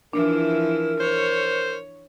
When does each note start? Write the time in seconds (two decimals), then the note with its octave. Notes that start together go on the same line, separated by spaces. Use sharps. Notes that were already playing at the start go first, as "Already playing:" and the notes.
0.13 E3 F3 D4 E4 A#4
1.00 C5 C#5